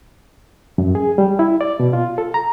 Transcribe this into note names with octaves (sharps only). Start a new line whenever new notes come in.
F#2
G#4
G3
E4
D5
B2
F4
A4
A#5